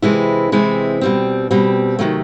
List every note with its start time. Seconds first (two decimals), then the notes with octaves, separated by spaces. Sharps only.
0.02 C3 E3 G#3 C4 E4
0.52 C3 E3 G#3 C4 E4
1.01 B2 G3 C4
1.51 B2 G3 C4
1.99 C3 D#3 F#3 A3